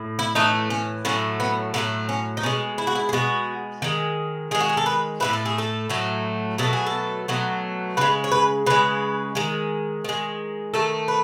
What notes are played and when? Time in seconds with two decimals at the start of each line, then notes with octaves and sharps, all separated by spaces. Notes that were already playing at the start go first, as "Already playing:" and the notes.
Already playing: A2
0.19 E4
0.35 A2 E3 A3 D#4
0.70 C#4
1.05 A2 F#3 A3 C#4
1.40 B3
1.74 A2 F#3 A3 B3
2.09 C#4
2.37 D#4
2.43 B2 G#3 C#4
2.78 E4
2.87 F#4
2.95 E4
3.09 G#4
3.13 B2 G#3 F#4
3.82 D#3 G#3
4.51 D#3 G#3 G#4
4.60 F#4
4.69 G#4
4.77 A4
4.86 B4
5.20 A2 F#3 A3 B4
5.33 A4
5.46 G#4
5.58 A4
5.90 A2 F#3 A3
6.58 B2 F#3 A3 A4
6.73 G#4
6.87 A4
7.28 B2 F#3 A3
7.97 C#3 G#3 B4
8.24 C#5
8.32 B4
8.67 C#3 G#3 B4
9.35 D#3 G#3
10.04 D#3 G#3
10.74 D#3 A3 A4
11.08 B4